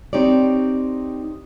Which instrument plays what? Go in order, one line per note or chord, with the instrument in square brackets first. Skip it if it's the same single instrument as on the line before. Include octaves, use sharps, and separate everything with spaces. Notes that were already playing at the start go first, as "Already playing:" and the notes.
[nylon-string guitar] C4 D#4 G4 C#5 D5